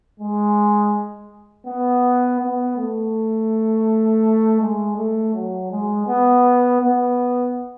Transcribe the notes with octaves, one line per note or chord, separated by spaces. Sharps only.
G#3
B3
B3
A3
G#3
A3
F#3
G#3
B3
B3